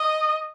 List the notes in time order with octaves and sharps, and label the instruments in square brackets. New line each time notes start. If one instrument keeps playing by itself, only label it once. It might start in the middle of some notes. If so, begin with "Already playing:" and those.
Already playing: [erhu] D#5